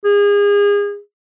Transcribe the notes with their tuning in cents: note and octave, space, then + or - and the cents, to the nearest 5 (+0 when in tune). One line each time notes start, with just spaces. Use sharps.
G#4 -30